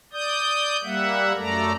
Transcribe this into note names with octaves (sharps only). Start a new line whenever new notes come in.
D5 D#6 G6
G3 A#3 E5 F#5
F#2 A3 A4 D5 A#5